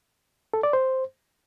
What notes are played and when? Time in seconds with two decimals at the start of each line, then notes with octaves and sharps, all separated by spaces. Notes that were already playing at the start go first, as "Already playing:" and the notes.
0.54 A4
0.63 D5
0.73 C5